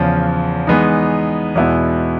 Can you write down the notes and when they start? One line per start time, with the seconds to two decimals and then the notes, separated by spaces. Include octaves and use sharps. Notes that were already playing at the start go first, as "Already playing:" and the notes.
Already playing: E2 C#3 F3
0.67 E3 G#3 B3 D#4
1.55 E2 B2 G#3 B3 E4